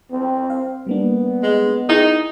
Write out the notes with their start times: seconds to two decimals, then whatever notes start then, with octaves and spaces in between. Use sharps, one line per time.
0.11 C4
0.50 F5
0.87 G3 A#3 B3 D4
1.43 G#3
1.89 D#4 E4 G#4